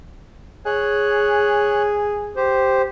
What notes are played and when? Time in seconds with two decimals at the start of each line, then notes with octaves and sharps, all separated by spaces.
0.66 G#4 C#5 F#6
2.36 G4 C5